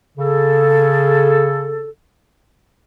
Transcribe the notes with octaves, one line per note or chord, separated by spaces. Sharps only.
C#3 G#4 A4